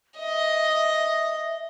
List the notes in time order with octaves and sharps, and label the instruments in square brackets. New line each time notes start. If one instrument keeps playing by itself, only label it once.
[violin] D#5 [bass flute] E5